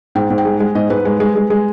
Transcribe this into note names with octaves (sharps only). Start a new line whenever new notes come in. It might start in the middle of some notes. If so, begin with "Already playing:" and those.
G#2 G5
G#2
G5
G#3
G#3
G#2 D#5
G#2 B4
G#3
G#3
G#3
G#3